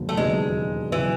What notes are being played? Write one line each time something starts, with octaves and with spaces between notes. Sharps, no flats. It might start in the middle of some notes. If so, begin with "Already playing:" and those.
Already playing: E1 D#2 C#3 F#3 B3
A3
E1 D#2 C#3 F#3 G#3 B3
C#3 E3 F#3 B3